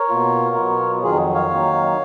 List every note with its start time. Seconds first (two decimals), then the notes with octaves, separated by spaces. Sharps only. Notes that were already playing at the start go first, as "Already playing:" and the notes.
Already playing: A#4 C#5
0.09 B2 A#3 F4
0.56 B2 F#3 B3 F4
1.03 F2 D#3 F#3 F4 G#4
1.34 C#5 F5
1.50 D#3 F#3 A#3 D#4